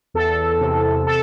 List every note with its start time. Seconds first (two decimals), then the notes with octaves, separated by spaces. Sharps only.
0.14 E2 A4
0.61 C3
1.07 A4